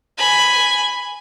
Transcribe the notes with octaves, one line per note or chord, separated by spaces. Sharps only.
G#5 B5